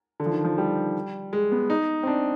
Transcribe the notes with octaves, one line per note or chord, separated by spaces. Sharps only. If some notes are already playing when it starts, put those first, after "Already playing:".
D3
F3
D#3
F3
G3
G#3
B3
D#4
C4
D4